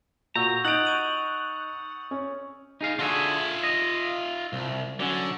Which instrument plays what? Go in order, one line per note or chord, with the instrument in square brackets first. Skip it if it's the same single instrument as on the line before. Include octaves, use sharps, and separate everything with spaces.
[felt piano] A#2 F#4 [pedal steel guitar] A#5 [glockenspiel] C#6 E6 G6
[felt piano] D#4 G6 D7 [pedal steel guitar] F#5 [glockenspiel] D#6 A6 F7
[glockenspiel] C#6 D#7 F7
[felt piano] C#4 C#5
[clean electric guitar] D#4 G#4 F5
[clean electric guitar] D3 F#4 G#4 [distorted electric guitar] F4 E5
[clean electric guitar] D#5
[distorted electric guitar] C2
[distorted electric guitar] D3 [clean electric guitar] F#3 C#4